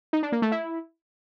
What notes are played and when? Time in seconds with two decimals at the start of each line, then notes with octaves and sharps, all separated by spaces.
0.13 D#4
0.23 D4
0.32 A#3
0.42 A3
0.52 E4